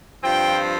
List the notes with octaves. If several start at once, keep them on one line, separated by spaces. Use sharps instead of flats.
G2 F3 C4 F4 G5